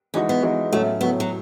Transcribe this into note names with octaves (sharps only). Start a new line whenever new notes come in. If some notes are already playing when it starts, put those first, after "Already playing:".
E3 G#3 C#4 D#4 F#4
B3
E3 G#3 D#4 F#4
A2 F#3 A3 C#4
A2 F#3 B3 C#4
F#3